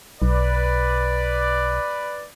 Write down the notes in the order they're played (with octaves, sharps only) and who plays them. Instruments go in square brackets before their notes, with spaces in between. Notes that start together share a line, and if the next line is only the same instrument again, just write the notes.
[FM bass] B1 [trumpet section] B4 D5